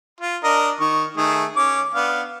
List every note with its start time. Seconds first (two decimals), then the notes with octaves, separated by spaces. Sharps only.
0.21 F4
0.44 D4 A#4 D#5
0.80 D#3 C#6
1.17 D#3 A3 G#4
1.56 C#4 D6
1.94 B3 D4 F5